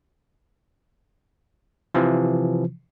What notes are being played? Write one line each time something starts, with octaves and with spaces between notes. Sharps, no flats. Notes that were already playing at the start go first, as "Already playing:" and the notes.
C3 E3 F3